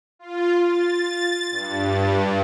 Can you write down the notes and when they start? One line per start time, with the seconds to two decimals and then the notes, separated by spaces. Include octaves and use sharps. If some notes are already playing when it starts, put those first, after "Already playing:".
0.19 F4
0.63 A6
1.51 G2